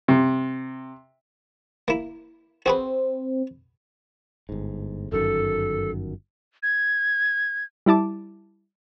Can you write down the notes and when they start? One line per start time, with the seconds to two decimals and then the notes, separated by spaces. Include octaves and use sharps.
0.08 C3
1.88 A#3 E4
2.66 C4 F#4 G#4 B4
4.49 G1 G#2
5.12 G1 F#2 D#3 A4
6.63 G#6
7.86 G3 E4 A5 D6